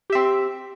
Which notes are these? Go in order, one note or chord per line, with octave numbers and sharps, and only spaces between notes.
C4 G4 E5